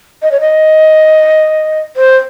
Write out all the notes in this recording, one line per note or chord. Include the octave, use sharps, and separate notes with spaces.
D#5
C#5
D#5
C5